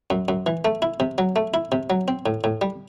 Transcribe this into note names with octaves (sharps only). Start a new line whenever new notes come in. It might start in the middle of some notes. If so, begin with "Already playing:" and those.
F#2
F#2
E3
A3
E4
C3
F#3
A3
E4
C3
F#3
C4
A2
A2
G3